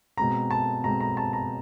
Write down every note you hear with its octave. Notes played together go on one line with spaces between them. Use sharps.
B2 G#3 C4 A#5
A5
B2 G#3 C4 A#5
A#5
A5
A#5